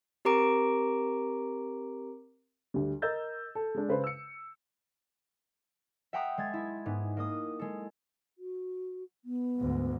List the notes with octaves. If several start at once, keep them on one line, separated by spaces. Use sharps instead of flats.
C4 G4 A#4 A#5 D6 D7
D2 G3
A#4 D#5 E6 G6 A6
A4
G#3 D4
C#3 B4 C5
E6 C#7
E5 F#5 G5 A#5 C6 D#6
G#3 G#6 A6
E4
G#2 B3
A#3 D#5 D#6
G#3 A4
F#4
B3
D2 G#2